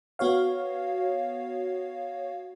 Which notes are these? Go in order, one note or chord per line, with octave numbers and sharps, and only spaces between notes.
B3 F#4 C#5 F5